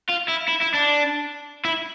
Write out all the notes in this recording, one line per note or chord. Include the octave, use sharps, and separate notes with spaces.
F4
E4
E4
E4
D4
E4